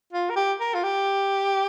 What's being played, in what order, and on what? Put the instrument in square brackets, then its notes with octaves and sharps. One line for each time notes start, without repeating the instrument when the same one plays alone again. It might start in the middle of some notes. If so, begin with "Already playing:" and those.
[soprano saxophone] F4
A#4
G4
A#4
F4
G4